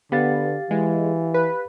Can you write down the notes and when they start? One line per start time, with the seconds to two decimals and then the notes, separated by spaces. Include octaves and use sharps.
0.12 D3 B3 G4 F5 A6
0.71 E3 G#3
1.34 B4